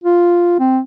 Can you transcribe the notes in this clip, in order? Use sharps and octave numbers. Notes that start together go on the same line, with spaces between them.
F4
C4